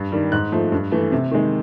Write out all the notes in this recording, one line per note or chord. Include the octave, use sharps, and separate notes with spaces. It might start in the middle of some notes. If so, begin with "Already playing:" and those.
Already playing: G2
D#3 G3
G#2 F#6
F3 A3
G2
E3 A3
C3
D#3 G#3